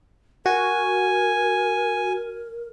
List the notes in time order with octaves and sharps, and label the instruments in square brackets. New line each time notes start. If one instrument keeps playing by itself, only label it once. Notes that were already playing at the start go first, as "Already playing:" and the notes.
[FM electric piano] F#4 [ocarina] A#4 [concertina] G#5